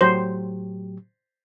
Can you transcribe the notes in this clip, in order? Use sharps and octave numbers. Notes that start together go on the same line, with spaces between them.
A2 F#3 G4 C5